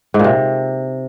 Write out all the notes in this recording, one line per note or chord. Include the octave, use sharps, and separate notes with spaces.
G#2
A#2
C3